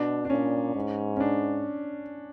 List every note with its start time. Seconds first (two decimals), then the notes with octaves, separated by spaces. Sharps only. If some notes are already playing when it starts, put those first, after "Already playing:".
Already playing: B2 D4
0.25 D4
0.30 A#2 C#4
0.76 G#2
1.17 C#4
1.20 D4